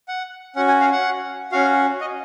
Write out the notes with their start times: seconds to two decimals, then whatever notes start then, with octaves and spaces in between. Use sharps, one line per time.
0.08 F#5
0.56 C#4 F#4 F#5
0.68 G#5
0.81 F5
0.92 F#5
1.52 C#4 F#4 F5
2.01 D#5